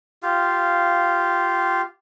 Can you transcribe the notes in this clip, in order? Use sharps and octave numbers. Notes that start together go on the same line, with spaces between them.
F4 G4 F5